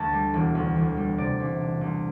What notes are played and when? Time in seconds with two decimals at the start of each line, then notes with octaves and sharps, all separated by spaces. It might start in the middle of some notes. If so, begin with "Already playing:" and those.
Already playing: D2 A5
0.13 G3
0.34 E1
0.55 D2
0.76 E1
0.97 G3
1.18 C3 D5
1.40 C2
1.60 D4
1.81 C2